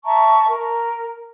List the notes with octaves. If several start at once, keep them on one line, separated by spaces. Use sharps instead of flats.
E5 A5 A#5 C#6
A#4